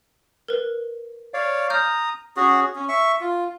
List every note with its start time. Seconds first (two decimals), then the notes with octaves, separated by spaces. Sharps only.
0.48 A#4 B4
1.34 C#5 D5 F5
1.70 A#5 D#6 F6 G6
2.37 C#4 F#4 G#4
2.75 C#4
2.89 E5 C#6
3.21 F4